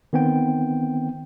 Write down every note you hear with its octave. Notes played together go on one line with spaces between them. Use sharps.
D#3 B3 C4 G5